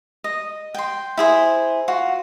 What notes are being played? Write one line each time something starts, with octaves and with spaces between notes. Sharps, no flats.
D#5
G5 C6
E4 G#4 C5
F4 F#4